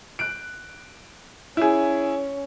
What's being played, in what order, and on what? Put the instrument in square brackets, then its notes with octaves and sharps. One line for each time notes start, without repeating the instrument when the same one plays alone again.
[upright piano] F#6 D7
[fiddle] C#4 [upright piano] E4 G#4